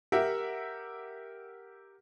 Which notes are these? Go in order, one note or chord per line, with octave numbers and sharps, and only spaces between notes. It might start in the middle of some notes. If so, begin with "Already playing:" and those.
G4 A#4 E5 F#5